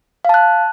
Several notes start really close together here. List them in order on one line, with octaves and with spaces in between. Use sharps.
F5 A5 F#6